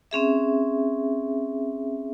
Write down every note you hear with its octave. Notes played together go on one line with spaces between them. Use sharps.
C4 C#4 G#4 E5